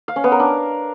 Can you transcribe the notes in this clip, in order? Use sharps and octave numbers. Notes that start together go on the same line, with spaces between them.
F5
C#4
B3
A#4
D4